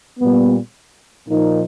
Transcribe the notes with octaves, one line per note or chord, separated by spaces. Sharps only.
A#2 G3 B3
A#2 F3 A#3 D#4